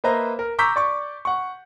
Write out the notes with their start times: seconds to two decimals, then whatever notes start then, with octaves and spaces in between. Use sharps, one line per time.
0.04 A#3 B4 C5 D#5 E5 A#5
0.39 A#4
0.59 A#5 C#6 D6 E6 G6 B6
0.76 D5 C#6 D6
1.25 F#5 C#6